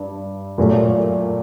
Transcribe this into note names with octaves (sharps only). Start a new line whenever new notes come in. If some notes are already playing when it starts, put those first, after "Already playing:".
Already playing: G2
A#2 F#3 A3